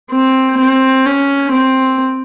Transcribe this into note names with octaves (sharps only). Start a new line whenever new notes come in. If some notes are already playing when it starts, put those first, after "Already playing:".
C4
C4
C#4
C4